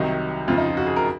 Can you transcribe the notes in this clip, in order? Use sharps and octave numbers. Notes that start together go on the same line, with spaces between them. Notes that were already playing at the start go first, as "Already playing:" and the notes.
Already playing: C2 C3 D#3 F#3 D#4
F2 C#3 F3 F4
D#4
F4
F#4
G#4
A#4